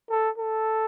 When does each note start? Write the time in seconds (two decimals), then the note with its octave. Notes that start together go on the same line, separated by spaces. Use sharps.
0.10 A4
0.38 A4